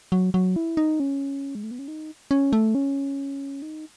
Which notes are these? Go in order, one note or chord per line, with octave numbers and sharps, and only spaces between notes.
F#3
F#3
E4
D#4
C#4
G#3
A3
B3
C#4
D#4
C#4
A3
C#4
D#4